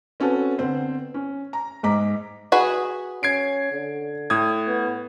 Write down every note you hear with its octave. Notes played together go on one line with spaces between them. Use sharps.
C4 C#4 F#4 A4 B4
D3 B3 C4 C5
C#4
A#5
G#2 G#3 A#5 D6 B6
F#4 G#4 B4
C#4 G#6 C7 D7
D3
A2 D#6 G#6
B3